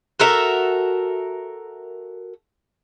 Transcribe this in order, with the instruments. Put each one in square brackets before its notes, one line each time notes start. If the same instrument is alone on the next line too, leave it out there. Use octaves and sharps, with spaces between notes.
[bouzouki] F#4 A4 A#4 E5